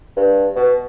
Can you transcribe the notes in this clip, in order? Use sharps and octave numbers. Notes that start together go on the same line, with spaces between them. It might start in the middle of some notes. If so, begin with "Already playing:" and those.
G2
B2